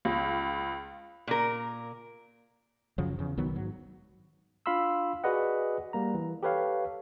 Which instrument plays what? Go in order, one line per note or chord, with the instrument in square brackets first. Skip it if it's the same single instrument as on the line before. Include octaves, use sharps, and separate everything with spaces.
[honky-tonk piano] C#2
[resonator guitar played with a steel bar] A#2 A#4
[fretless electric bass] F#2 C#3 F3 F#3
E2 C#3
B1 D#3 F#3 B3
G#2 F#3
[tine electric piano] D4 F4 F5 B5 C6 E6
F#4 G#4 B4 D5 D#5 F#5
G3 A#3 A#5
E3
G4 A4 B4 C#5 F5